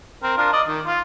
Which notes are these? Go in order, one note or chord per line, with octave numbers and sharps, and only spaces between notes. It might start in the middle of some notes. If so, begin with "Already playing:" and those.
C4 A#4
D4 F4 A#4
D5 D#5
D#3
F4